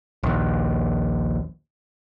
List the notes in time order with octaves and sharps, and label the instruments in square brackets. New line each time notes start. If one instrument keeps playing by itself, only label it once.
[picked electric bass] A#1 D#2